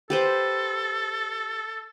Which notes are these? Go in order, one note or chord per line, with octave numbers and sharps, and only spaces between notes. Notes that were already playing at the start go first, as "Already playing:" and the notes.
G4 A4 B4 C5